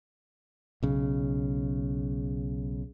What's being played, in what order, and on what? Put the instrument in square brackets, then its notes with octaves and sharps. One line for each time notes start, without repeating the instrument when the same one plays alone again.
[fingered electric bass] B1 C#3